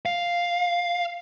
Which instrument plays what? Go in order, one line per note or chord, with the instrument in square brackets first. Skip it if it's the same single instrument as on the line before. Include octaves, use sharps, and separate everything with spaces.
[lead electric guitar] F5